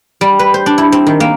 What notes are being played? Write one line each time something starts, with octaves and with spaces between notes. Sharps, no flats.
G3
B4
C5
D4
E4
C4
D#3
A#3